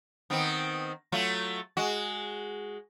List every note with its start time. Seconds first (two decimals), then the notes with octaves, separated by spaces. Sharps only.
0.30 D#3 B3 C4
1.12 F#3 A3 F4
1.77 G#3 F#4